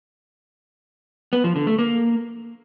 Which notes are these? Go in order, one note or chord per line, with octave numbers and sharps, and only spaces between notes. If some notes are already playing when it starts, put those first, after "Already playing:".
B3
F3
D3
A3
A#3